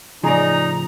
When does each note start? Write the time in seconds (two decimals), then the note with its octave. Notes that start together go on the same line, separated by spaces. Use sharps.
0.24 A2 C#3 F3 D#4 G#4 D5 A#5